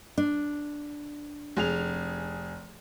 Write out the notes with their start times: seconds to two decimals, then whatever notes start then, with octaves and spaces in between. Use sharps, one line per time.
0.18 D4
1.57 F1 G#4 F7